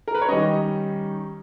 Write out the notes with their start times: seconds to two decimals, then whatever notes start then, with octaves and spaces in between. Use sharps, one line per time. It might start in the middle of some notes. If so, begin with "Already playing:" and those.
0.08 A#4
0.15 B4
0.22 C#5
0.28 D#3 G3 C#4 D#5